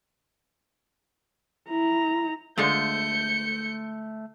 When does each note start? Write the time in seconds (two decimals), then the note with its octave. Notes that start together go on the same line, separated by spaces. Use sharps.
1.70 E4 A#5
2.58 D3 G#3 A3 F4 C5 G6 C#7